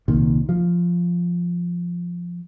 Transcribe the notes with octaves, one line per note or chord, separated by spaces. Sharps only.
C2 A#2 D#3
F3